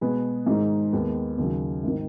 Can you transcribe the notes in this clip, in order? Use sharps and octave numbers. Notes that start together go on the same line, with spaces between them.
B2 G#3 B3 G#4 B4
G#2 D#3 G#3 D#4 G#4
D#2 D#3 G#3 B3
D#2 C#3 F#3
G#1 D#3